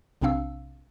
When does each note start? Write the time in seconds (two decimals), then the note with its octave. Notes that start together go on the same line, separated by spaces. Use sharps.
0.21 B1 C3 C4 D4 F5 E6